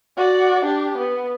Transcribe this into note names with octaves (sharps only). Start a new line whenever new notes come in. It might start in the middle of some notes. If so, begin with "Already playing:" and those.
F#4 D5
D4 G4
B3